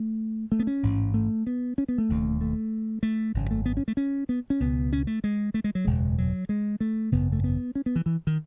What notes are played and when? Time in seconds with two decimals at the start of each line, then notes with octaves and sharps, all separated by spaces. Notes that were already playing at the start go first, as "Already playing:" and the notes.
Already playing: A3
0.52 A3
0.59 B3
0.67 C#4
0.83 A1 G#2
1.14 A3
1.47 B3
1.78 C#4
1.89 B3
1.98 A3
2.09 E1 D#2 C#3
2.41 A3
3.03 A3
3.34 G#1 F#2 C#3
3.51 A3
3.66 B3
3.77 C#4
3.88 A3
3.97 C#4
4.29 B3
4.50 C#4
4.60 C#2 B2 B3
4.93 C#4
5.07 A3
5.24 G#3
5.54 A3
5.64 G#3
5.75 F#3
5.85 F#1 E2 B2 G#3
6.18 F#3
6.49 G#3
6.80 A3
7.12 G#1 F#2 C#3 B3
7.32 A3
7.44 B3
7.75 C#4
7.86 B3
7.96 E3
8.06 E3
8.27 D#3